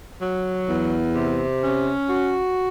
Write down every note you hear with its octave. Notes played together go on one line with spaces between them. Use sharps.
F#3
E2
C3
C#4
F#4